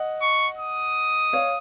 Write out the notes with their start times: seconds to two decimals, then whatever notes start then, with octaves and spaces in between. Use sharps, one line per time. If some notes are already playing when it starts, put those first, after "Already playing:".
Already playing: D#5 F#5
0.22 C#6
0.58 D#6
1.33 C#5 F5